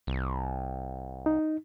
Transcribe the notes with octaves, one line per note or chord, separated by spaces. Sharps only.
C2
D#4